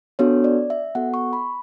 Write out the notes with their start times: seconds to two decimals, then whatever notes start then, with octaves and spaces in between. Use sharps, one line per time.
0.19 B3 D4 F#4 A4 C#5
0.44 D5
0.70 E5
0.95 B3 F#4 A4 F#5
1.14 C#6
1.33 B5